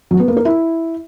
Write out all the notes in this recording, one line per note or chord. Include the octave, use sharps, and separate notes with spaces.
F#3
B3
A#3
A#4
E4